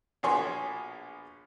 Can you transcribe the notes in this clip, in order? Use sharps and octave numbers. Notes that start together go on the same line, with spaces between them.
A#1 B2 G#4 C#5 C6